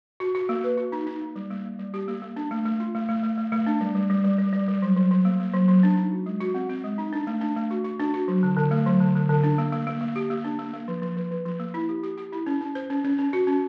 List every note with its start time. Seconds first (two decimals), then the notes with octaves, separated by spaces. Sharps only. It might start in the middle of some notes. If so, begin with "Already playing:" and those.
0.20 F#4
0.35 F#4
0.49 A#3
0.64 B4
0.78 F#4
0.92 D#4
1.07 D#4
1.21 A#3
1.36 G3
1.51 A#3
1.65 A#3
1.79 G3
1.94 G4
2.08 A#3
2.22 A#3
2.36 D4
2.51 A3
2.65 A3
2.80 F4
2.95 A3
3.09 A3
3.23 A3
3.38 A3
3.52 A3
3.67 D4
3.81 G3
3.95 G3
4.10 G3
4.24 G3
4.38 G3
4.53 G3
4.68 G3
4.82 F#3
4.96 F#3
5.11 F#3
5.25 A#3
5.40 A#3
5.54 F#3
5.68 F#3
5.83 D4
5.97 D#4
6.12 F#4
6.26 G#3
6.41 F#4
6.54 C4
6.69 C4
6.84 G#3
6.98 D#4
7.13 D4
7.27 A3
7.41 D4
7.56 A3
7.71 F#4
7.85 F#4
8.00 D4
8.14 F#4
8.28 F#3
8.43 D3
8.57 D3
8.71 A3
8.86 F#3
9.00 D3
9.15 D3
9.29 D3
9.44 D4
9.58 A#3
9.72 A#3
9.87 A#3
10.01 A#3
10.16 G4
10.30 A#3
10.44 D4
10.59 A#3
10.73 A#3
10.88 F3
11.02 F3
11.17 F3
11.31 F3
11.45 F3
11.60 A#3
11.74 E4
11.89 G4
12.03 G4
12.17 G4
12.32 E4
12.46 C#4
12.61 C#4
12.75 C5
12.90 C#4
13.05 C#4
13.19 C#4
13.33 F#4
13.47 C#4